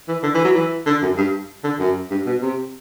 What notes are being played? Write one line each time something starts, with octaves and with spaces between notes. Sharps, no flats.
E3
D3
E3
F#3
E3
D3
F#2
G2
D3
F#2
G2
B2
C3